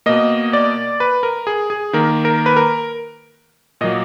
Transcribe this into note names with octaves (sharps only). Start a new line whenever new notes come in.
B2 A#3 D#5
D5
B4
A#4
G#4
G#4
D#3 A#3 A#4
A#4
B4
A#4
A#2 F#3 A#3 D#5